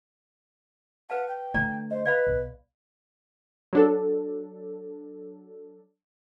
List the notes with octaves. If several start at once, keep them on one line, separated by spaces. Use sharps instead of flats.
B4 F5 F#5 A5
G5
D3 A3 D5 A#5
C5 D#5
B4 D5 F5 B5
B1
F#3 D4 A4